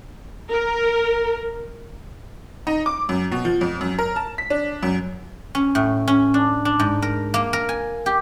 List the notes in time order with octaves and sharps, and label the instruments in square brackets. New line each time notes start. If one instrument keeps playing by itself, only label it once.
[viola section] A#4
[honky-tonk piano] D#4
D6
F#2
B2
F3
F2
F#2
A#4
A5
B6
D4
F#2
[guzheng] C#4
A2
C#4
D4
D4
G#2
A#4
A#3
A#4
G#5
G4